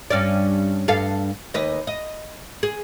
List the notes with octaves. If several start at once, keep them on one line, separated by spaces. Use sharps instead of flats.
G2 C#4 D5
G2 A4 F5
D#2 B4 D#5
D#5
G#4